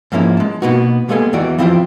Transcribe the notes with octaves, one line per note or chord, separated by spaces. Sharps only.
G#2 F3 A#3 C#4 E4
G#3 A5
B2 D3 A#3 B3 D#4 F#4
G3 G#3 A#3 B3 A4 G#5
E2 D#3 E3 D#4 F#4 D5
F3 C4 E4 F4 E5 G5